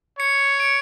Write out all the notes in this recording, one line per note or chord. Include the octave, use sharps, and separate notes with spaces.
C#5 C#7
D7